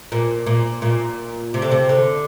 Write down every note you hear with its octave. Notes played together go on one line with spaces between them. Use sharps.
A#2
A#2
A#2
C3
D3
C3
D3